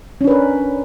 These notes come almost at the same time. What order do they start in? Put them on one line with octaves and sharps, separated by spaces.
C#4 D4 B4 A#4